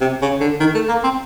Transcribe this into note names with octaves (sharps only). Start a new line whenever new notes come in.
C3
C#3
D3
D#3
A3
A#3
C4